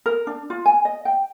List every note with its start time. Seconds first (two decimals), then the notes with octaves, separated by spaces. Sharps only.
0.06 A#4
0.27 D4
0.50 F4
0.66 G#5
0.85 D#5
1.05 G5